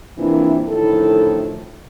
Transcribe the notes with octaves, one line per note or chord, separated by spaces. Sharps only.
C3 E3 F3 A#3 D4 E4
D2 A2 D#3 F3 E4 A4